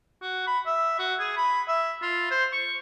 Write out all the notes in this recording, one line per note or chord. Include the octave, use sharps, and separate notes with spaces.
F#4
B5
E5
F#4
G#4
B5
E5
F4
C5
C#6